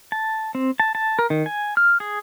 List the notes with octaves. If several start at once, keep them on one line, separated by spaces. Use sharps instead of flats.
A5
C4
A5
A5
A#4
D#3
G#5
F6
G#4